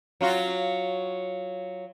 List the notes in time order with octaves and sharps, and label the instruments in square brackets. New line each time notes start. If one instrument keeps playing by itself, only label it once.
[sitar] F#3 F4 F#4